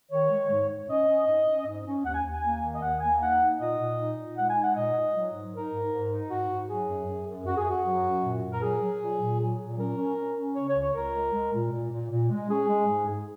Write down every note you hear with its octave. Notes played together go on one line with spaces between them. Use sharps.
D#3 C#5
G#3
G#2
G#2
C#4 D#5
C#4
G#2
C#4
G#2
C#4
D#2 F#5
G#5
D#2
G#5
A#3
D#3
D#5
D#2 F#5
A#3 G#5
D#4 F#5
D#4
A#2 D#5
A#2
D#4
A#2
G#3 F#5
G#5
D#4
F#5
A#2 D#5
A#2
F#3
G#2
D#4 A#4
G#2
G#2
D#4
G#2 F#4
G#2
F#3 G#4
F#2
F#2
F#2
F#2 F#4
G#4
F#2 F#4
F#3
F#2
A#2
A#2
A#4
F#3 G#4
F#3
A#2
A#2
F#3
A#2
C#4 A#4
C#4
C#4
C#4
C#3 C#5
C#5
C#2
C#5
C#2 A#4
G#3
G#3
A#2
A#2
A#2
A#2
G#3
C#4 G#4
G#3
G#2
G#2